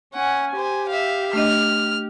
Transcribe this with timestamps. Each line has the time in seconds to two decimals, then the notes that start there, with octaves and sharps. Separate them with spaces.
0.14 C#4 F#5 G#5
0.56 G4 C5 G#5
0.89 E5 F5
1.33 A3 D4 D#5 F6